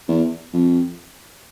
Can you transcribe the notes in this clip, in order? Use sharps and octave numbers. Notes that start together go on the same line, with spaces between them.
E2
F2